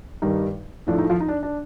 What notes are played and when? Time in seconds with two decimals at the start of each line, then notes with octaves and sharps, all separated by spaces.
0.22 G2 D#3 G3 D#4
0.87 A2 F3 A3 D4
0.98 D#4
1.10 F3 F4
1.20 D#4
1.28 D4
1.43 D4